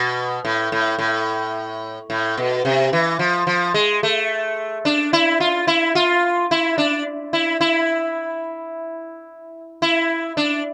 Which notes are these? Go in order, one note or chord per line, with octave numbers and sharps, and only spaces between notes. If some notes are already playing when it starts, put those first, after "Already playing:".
Already playing: B2
A2
A2
A2
A2
B2
C3
E3
F3
F3
G#3
A3
D4
E4
F4
E4
F4
E4
D4
E4
E4
E4
D4